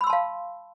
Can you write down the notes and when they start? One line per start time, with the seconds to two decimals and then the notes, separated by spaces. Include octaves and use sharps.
0.01 B5
0.04 E6
0.07 C6
0.10 A5
0.13 F5